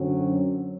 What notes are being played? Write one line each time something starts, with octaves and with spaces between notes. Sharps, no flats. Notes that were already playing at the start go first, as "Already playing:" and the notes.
Already playing: F#2 D3 F#3 C4